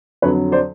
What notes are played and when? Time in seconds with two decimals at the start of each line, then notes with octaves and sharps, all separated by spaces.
0.22 F2 D3 F#3 B4 C#5
0.52 C5 D5